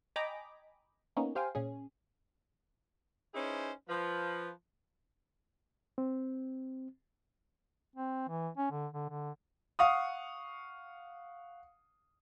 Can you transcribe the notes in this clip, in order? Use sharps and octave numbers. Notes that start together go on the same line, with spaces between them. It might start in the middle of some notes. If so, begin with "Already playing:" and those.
D#5 G5 G#5 A#5 B5 D6
A#3 B3 C#4 D#4
G4 C5 F5 G5 G#5
A#2 C#4 G#4
C#4 D#4 E4 G#4 B4 C5
F3 B4
C4
C4
E3
C#4
D3
D3
D3
F5 F#5 C#6 D#6